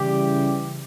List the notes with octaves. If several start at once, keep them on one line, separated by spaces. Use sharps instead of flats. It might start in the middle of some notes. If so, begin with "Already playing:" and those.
Already playing: C#3 E3 G3 G4